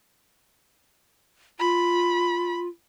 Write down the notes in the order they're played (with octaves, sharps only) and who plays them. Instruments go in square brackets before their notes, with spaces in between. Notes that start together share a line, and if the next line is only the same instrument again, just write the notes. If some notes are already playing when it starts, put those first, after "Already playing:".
[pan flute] F4 [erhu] B5